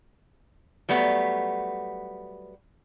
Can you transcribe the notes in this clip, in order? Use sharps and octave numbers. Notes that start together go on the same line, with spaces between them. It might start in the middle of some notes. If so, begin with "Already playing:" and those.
F#3 G3 A3 B3